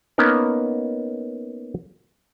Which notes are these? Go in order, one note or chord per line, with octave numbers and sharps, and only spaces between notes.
A#3 B3 C#4 D#4 A#4